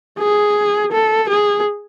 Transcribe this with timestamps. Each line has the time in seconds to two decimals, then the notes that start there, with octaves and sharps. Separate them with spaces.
0.18 G#4
0.92 A4
1.29 G#4